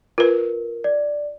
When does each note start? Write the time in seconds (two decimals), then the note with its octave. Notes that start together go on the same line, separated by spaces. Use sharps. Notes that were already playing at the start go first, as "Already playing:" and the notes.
0.18 F4 A#4 B4
0.84 D5